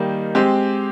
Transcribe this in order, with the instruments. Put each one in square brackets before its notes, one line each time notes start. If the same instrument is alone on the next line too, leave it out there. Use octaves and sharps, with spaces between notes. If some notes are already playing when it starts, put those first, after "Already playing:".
Already playing: [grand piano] D#3 G3 A#3 D#4
G#3 C4 G4